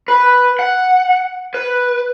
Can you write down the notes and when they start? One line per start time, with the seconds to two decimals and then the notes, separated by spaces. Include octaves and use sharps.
0.08 B4
0.59 F#5
1.54 B4